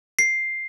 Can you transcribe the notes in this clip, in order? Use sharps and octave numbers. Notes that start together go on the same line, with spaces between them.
C7